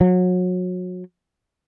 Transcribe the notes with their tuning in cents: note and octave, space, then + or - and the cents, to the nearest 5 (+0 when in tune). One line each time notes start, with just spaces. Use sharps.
F#3 -30